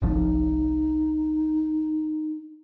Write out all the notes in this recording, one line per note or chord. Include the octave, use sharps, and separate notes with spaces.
G1 C2 F3 D#4